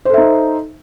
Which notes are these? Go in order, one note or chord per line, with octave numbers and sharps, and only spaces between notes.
D#4 A4 C5 E5